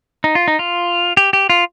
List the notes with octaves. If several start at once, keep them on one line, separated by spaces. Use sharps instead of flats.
D#4
F4
D#4
F4
G4
G4
F4